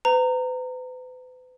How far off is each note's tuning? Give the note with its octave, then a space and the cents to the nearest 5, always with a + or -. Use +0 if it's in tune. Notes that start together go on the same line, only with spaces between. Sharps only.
B4 +40 A#5 -20